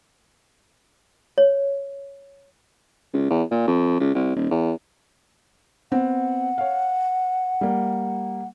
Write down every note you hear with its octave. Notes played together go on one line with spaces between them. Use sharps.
C#5
C#2
E2
A#2
F2
C#2
C2
D#1
E2
B3 C4 F#5
C#5 F5
G3 A#3